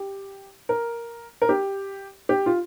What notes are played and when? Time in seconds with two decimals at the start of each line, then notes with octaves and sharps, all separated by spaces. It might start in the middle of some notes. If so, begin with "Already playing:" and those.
Already playing: G4
0.69 A#4
1.42 A#4
1.49 G4
2.29 G4
2.46 F4